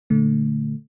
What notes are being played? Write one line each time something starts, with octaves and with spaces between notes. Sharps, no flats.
A#2 D3 A3